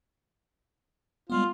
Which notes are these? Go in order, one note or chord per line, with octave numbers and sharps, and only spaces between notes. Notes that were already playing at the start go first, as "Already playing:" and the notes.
G3 G#3 B3 F4